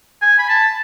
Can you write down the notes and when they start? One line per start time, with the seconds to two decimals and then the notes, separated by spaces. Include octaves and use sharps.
0.22 G#5
0.39 B5
0.49 A5